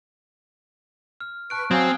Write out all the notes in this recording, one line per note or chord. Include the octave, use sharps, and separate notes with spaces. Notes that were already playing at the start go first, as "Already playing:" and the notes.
F6
B4 A5 C#6 F#6 D7
F#3 C4 F5 G#5 D#6 G#6